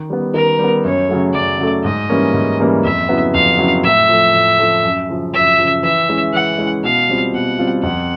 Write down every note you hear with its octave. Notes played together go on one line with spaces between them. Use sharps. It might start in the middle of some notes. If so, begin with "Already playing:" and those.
Already playing: D#3
G3 B3
D#3 A#4
G3 B3
F#2 C#5
C#3 F#3 A3
F#2 D5
C#3 F#3 A3
G#2 D#5
E3 G3 A#3 C#4
G#2
E3 G3 A#3 C#4
F2 E5
C#3 F#3 B3 E4
F2 F5
C#3 F#3 B3 E4
A2 E5
F3 A3
A2
F3 A3
F#2
C#3 F3
F#2 E5
C#3 F3
E3 E5
G#3 C#4 E4
E3 F#5
G#3 C#4 E4
B2 F5
G3 C4 F4
B2 F#5
G3 C4 F4
F2 F#5